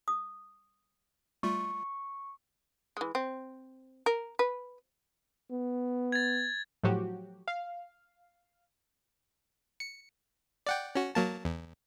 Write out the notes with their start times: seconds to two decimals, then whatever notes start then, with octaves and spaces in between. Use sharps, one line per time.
0.08 D#6
1.43 G3 A3 F4 C#6
2.97 E3 G#3
3.15 C4
4.06 A#4
4.39 B4
5.51 B3
6.12 G#6 A6
6.83 A2 F3 F#3 F#4 G4
7.48 F5
9.80 C#7
10.67 D5 F#5 G5
10.95 C#4 F#4
11.15 F#3 A#3 A5
11.45 E2